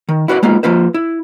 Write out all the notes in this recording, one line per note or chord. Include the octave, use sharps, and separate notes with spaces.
D#3
E4 F#4 B4 D5
G#3 A#3 B3 D#4 F4
F3 A#3 F4 B4 C5
E4